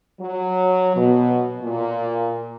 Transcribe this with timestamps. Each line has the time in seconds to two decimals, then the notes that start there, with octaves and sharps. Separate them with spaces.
0.20 F#3
0.96 B2
1.63 A#2